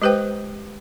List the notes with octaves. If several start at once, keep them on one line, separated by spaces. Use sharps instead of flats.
G#3 G4 B4 C5 G5